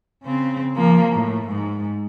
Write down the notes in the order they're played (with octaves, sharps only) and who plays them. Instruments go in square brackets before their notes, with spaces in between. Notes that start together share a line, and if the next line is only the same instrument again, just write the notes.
[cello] C#3 C4
F3 A#3
A2
G#2